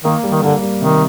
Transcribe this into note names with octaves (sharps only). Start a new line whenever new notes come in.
D#3 A#3
G3
D#3
D3 A#3
G3
C3 D#3